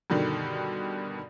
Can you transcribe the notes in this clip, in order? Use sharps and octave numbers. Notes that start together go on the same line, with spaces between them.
G2 B2 D3 D#3